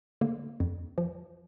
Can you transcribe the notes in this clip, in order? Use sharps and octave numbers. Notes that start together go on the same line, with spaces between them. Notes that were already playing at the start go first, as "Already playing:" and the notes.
D3 A#3
F2
F3